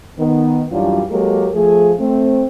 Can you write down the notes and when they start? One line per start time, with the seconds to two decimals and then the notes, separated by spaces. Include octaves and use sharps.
0.18 D#3 B3
0.72 F#2 E3 F#3 G3 D4 F4
1.10 F#3 G#3 A#3 G4 A4 A#4
1.54 F3 A3 G#4
2.00 A3 C4